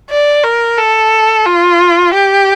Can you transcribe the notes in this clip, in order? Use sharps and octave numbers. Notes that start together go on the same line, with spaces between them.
D5
A#4
A4
F4
G4